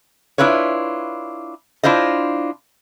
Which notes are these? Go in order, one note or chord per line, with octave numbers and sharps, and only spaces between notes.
D4 E4 F4 B4 C#5
D4 E4 F4 C5 D#5